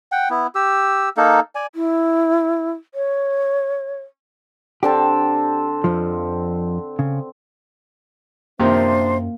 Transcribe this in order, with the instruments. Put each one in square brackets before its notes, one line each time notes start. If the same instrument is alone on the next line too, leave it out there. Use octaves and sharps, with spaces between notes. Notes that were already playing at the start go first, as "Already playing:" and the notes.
[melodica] F#5 G5
B3 E4
G4 E6
A#3 D#4 A4
D5 G#5
[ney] E4
C#5
[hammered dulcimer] D3 C4 A5 [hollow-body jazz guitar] G4
[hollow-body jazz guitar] F2 F3
C#3
[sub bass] F#2 [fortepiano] C3 D#3 F3 [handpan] A#3 [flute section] D4 C5 E5